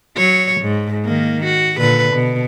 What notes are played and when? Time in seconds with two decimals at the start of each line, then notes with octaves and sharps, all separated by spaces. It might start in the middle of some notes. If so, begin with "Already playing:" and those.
0.17 F#3 C#5
0.61 G#2
1.05 D#3 A#3
1.45 F#4
1.78 A#2 D3 B4
2.14 B2